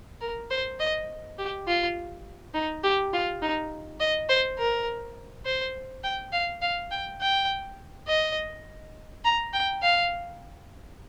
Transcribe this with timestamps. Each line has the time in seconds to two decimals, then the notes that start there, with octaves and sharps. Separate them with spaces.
0.21 A#4
0.51 C5
0.80 D#5
1.38 G4
1.67 F4
2.55 D#4
2.83 G4
3.13 F4
3.42 D#4
4.00 D#5
4.29 C5
4.59 A#4
5.45 C5
6.03 G5
6.33 F5
6.62 F5
6.91 G5
7.21 G5
8.08 D#5
9.25 A#5
9.54 G5
9.82 F5